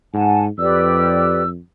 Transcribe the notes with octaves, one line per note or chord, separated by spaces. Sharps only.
G#2 F#5 G#5 A5
F2 G4 B4 D5 E6